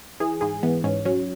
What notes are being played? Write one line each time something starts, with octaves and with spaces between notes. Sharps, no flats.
E3 G#4
G#2 G#4
E3 B3
G#2 C#4
F#3 C#4